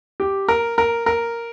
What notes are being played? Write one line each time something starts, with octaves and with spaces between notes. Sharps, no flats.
G4
A#4
A#4
A#4